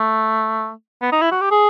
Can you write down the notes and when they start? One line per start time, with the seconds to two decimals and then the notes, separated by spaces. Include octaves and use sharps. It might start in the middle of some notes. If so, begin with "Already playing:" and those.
Already playing: A3
1.02 B3
1.12 D#4
1.22 E4
1.32 F#4
1.41 G4
1.51 G#4